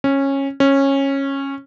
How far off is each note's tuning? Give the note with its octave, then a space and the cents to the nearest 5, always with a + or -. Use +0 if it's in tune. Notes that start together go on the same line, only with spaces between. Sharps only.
C#4 -15
C#4 -15